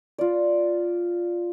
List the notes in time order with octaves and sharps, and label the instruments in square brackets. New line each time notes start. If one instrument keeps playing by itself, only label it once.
[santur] F4 D5